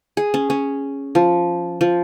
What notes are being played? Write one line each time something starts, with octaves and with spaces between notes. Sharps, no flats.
G#4
C#4
C#4
F3
F3